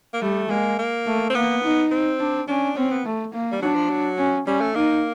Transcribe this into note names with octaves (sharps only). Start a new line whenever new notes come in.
A#3
G3 A3
G#3 A#3
A#3
A3
C4
A#3 B3
D#4
C4
D4
C#4 D4
C4 C#4
B3
A3
A#3
G3
F#3 D4
F3
F#3
C#4
G3 C#4
A3
A#3 D#4